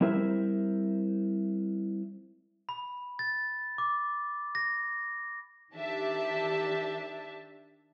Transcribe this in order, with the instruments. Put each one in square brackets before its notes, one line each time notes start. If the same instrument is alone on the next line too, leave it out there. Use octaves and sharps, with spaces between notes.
[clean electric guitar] G3 C4 E4 A#4 C5 E5
[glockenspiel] B5
A6
D6
A#6
[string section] D#3 D4 G4 E5 A5